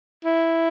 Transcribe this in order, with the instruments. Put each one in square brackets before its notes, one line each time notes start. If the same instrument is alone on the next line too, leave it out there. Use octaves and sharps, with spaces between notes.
[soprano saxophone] E4